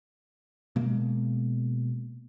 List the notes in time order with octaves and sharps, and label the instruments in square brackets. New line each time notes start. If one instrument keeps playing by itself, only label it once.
[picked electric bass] B2 G#3 A#3